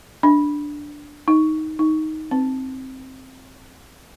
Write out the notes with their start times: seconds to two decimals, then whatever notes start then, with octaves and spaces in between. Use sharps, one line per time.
0.23 D4
1.28 D#4
1.79 D#4
2.31 C4